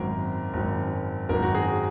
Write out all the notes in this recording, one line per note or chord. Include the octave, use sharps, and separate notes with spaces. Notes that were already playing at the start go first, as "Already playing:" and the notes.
Already playing: G#1 F#2 D#3 A#4
G#1 F#2 D#3
G#1 F#2 D#3 A#4
F#4
G#4